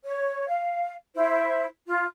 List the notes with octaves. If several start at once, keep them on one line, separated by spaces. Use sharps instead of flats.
C#5
F5
E4 C5
F4